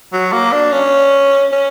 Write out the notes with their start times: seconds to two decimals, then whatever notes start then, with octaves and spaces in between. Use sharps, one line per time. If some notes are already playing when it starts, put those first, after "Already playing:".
0.13 F#3
0.33 A#3
0.52 D4
0.72 C#4
1.52 C#4